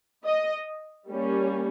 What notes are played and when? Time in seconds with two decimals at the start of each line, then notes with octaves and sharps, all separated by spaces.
0.25 D#5
1.09 G3 A#3 C#4